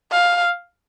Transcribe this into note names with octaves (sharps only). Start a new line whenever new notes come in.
F5